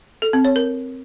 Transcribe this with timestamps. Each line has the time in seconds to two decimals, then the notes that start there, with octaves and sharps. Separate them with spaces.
0.22 A4
0.33 C4
0.45 C#5
0.56 A#4